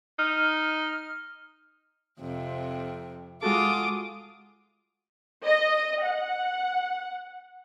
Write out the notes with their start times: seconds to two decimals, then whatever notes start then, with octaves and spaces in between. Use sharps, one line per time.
0.19 D#4 F6
2.20 F2 C3
3.42 G#3 F4 F#4 A4 D6 D#6
5.45 D#5
6.05 F#5